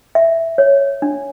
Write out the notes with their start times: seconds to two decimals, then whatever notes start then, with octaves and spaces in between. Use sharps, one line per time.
0.15 E5
0.58 C#5
1.02 D4